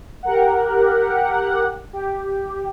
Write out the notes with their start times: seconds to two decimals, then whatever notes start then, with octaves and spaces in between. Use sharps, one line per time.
0.23 G4 A#4 F#5
1.93 G4